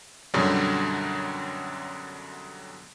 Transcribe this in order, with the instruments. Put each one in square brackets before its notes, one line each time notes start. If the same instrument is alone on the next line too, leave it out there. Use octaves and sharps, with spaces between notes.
[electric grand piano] F#2 B2 D3 F#3 G3